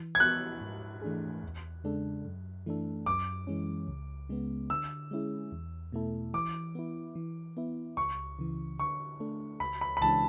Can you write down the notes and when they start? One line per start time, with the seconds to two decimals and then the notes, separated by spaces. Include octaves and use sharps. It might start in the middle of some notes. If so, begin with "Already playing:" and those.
Already playing: E3
0.15 G#6
0.20 B3 F#4 F#6
0.61 G#2
1.02 E3 A3 D4 G#4
1.43 E2
1.84 C#3 G#3 D4 A4
2.25 F#2
2.66 E3 A3 D4 A4
3.06 F#2 D6
3.47 E3 G#3 C#4
3.88 C#2
4.29 C#3 G#3 B3
4.70 D3 E6
5.11 G#3 C#4 E4 G#4
5.52 E2
5.92 B2 A3 E4 A4
6.34 E3 D6
6.75 B3 E4
7.15 E3
7.57 B3 E4
7.97 C#2 C#6
8.39 C#3 E3
8.79 D3 C#6
9.20 A3 D4 A4
9.60 C#2 B5
9.81 B5
9.97 B5
10.01 C#3 E3 G#3 D4 A5